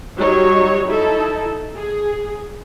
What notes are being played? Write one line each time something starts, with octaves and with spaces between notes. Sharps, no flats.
F#3 G3 D#4 C#5
D#4 E4 A4
G#4